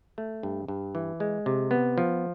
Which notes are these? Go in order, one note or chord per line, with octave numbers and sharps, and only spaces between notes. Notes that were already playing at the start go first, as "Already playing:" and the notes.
A3
G2
G2
E3
G#3
C3
B3
F3